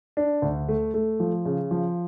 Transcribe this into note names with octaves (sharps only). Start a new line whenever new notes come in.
D4
D2
A3
A3
F3
C#3
F3